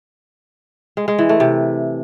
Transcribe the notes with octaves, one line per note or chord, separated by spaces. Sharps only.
G#3
G#3
E3
A3
C3